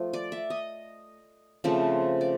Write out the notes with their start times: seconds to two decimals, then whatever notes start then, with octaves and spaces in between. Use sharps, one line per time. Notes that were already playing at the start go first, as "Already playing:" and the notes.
Already playing: F3 A3
0.13 D5
0.32 E5
0.50 D#5
1.64 C#3 F3 A3 C4
2.21 D5